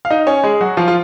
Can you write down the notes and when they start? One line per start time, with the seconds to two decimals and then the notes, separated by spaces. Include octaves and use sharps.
0.05 F5
0.10 D#4 D#5
0.27 C#4 C#5
0.44 G#3 G#4
0.61 F#3 F#4
0.77 F3 F4
0.88 F4